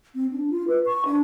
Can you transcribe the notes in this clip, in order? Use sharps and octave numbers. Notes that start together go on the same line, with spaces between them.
C4
D4
F4
B4
C#6
D4